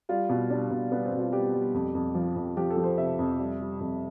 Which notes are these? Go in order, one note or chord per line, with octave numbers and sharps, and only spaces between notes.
G3 F4
B2
G3 D4
B2
G3 B3
C4
B2
F4
G3 G4
G3
F2
F2
F3
F2
F3 G4
A4
F3
C5
C3 E5
F2
G3
G3
F2